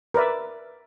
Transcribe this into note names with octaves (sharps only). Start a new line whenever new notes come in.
A#4 B4 D5 E5